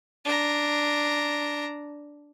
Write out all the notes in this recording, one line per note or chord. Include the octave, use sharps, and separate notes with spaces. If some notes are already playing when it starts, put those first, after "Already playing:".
D4 A#5